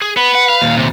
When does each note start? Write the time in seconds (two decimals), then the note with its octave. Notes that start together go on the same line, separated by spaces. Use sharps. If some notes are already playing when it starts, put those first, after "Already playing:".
0.01 G#4
0.17 B3 B4
0.35 F#5
0.49 F5
0.62 D#2 A#2
0.77 C3